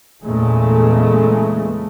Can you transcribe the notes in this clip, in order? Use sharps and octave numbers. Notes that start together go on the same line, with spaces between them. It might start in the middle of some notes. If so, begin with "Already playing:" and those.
E2 A#2 C#3 G#3 A3